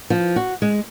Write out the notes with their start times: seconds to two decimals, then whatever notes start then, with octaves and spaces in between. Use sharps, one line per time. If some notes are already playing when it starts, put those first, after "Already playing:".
0.10 F3
0.36 F#4
0.62 G#3